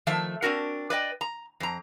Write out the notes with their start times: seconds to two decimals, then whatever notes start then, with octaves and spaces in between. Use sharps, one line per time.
0.07 D#3 F3 A3 E5 A5
0.42 C4 D4 F#4 A#4
0.90 B4 D5 D#5 G5
1.21 A#5
1.60 F2 A#5